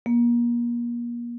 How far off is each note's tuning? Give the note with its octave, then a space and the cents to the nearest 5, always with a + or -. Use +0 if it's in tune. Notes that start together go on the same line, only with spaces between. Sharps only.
A#3 +35